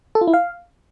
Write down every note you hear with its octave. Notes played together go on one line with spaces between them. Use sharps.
A4
F4
E4
F5